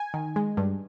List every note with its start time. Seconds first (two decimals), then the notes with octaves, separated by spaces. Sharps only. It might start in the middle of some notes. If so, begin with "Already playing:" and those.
Already playing: G#5
0.14 D#3
0.36 G#3
0.57 G2